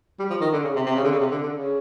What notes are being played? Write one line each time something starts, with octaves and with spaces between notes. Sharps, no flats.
G3
F3
D#3
D3
C#3
C3
C3
C#3
D3
C#3
C3
D3
D3
C#3